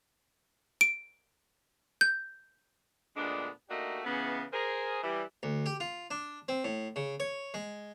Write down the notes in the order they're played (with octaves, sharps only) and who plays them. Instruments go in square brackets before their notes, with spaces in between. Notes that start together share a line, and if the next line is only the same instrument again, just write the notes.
[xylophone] D7
G6
[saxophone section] D2 A#2 G#3 B3 D4
A3 A#3 D4 D#4 F#4 G4
C#3 E3 B3
G#4 A#4 C5
E3 G3
[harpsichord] D2
G4
F4
D4
C4
A2
C#3
C#5
G#3